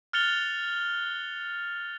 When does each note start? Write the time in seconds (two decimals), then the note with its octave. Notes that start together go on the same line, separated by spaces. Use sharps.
0.13 F6 F#6 A6 C#7 F7 G7